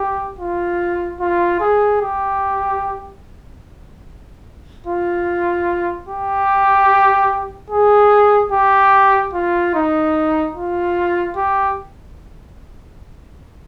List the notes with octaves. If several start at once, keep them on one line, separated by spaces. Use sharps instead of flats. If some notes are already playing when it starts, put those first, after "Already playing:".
Already playing: G4
F4
F4
G#4
G4
F4
G4
G#4
G4
F4
D#4
F4
G4